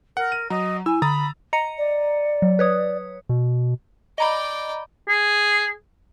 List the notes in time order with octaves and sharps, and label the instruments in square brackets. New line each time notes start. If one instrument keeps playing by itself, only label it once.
[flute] A#4 [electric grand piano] F#5
[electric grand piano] D#7
[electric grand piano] F#3 [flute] D#5 [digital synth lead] A#5
[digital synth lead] E4 [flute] G#5 [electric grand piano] E6
[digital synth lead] D3 [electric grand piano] A#5 D#6 A6 [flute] B5
[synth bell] D#5 A#5 C#7
[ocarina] D5
[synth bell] F#3
B4 C#5 D#6
[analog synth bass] B2
[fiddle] D5 G5 [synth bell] D#5 A#5 B5
[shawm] G#4